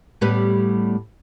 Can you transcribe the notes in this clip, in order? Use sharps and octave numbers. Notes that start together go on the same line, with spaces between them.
A2 G3 B3